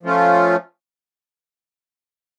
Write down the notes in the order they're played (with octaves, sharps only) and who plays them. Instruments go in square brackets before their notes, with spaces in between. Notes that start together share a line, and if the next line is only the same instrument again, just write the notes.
[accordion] F3 A3 C#4 F4